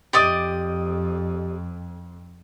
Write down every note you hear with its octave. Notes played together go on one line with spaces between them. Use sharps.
F2 G4 D5 D#5